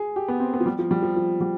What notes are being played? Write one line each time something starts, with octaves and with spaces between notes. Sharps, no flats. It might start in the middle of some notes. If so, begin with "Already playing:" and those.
Already playing: G#4
G4
B3
C4
B3
F3
G3
F3
G3
F3
F3
G3